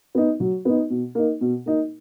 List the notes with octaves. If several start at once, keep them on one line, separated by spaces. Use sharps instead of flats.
B3 D#4
F#3
B3 D#4
B2
A#3 D#4
B2
A#3 D#4